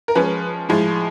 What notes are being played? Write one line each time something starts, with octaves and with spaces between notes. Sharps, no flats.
A#4
F3 G#3 C#4 B4
A2 F3 G#3